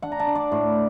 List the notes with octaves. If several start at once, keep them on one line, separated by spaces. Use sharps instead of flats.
D4 F#5
A#5
A5
D4
D5
A2